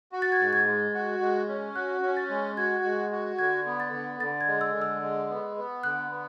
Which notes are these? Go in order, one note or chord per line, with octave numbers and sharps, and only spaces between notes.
F#4
A6
G#6
G#2 A6
G#6
G#3
F#4
G#3
C#4
F#4 F#6
C#4
A6
G#3
F#4 G#6
G#3
F#4
D3 G#6
B3
A6
D3
D3 A6
G#6
G#3
E6
D3
E6
G#3
B3
B3
D3 F#6
B3